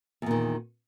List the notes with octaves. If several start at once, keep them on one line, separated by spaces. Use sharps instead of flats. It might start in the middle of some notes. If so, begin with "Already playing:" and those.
E2 A#2 D#3